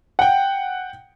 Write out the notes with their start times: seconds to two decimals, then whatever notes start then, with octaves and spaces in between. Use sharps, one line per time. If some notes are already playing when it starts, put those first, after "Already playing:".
0.19 F#5 G5